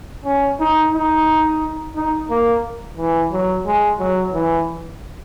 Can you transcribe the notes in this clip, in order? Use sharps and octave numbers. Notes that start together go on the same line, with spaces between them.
C#4
D#4
D#4
D#4
A#3
E3
F#3
G#3
F#3
E3